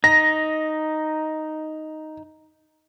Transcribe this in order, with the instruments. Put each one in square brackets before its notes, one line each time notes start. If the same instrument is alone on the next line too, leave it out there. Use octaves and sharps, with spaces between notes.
[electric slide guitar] D#4 [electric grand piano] A#6